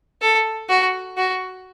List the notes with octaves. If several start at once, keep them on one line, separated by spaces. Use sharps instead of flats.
A4
F#4
F#4